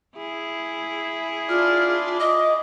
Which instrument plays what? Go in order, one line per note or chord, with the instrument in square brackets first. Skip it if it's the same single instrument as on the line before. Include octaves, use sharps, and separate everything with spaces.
[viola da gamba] E4 G#4
[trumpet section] D4 D5 [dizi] F4 [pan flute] F6
[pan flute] D#5 [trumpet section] D6 D#6